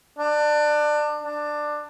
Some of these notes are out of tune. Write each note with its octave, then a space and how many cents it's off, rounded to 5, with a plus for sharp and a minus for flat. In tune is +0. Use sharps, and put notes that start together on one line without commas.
D4 +25
D4 +15